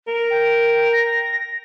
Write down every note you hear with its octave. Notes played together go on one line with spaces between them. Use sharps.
A#4
G5
A#6